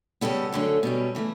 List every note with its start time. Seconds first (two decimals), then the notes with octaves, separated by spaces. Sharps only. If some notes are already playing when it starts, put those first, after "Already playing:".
0.21 C#3 G3 B3 A4
0.53 F#2 D3 A3 C#4
0.83 B2 G3 C#4
1.15 C#3 E3 A3